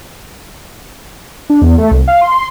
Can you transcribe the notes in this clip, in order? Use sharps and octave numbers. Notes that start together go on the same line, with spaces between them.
D4
E2
A3
C2
F5
C6